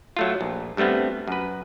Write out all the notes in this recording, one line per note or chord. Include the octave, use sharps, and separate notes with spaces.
F#3 A3 F4
A#1
G2 G3 A3 B3 C4
F#2 B4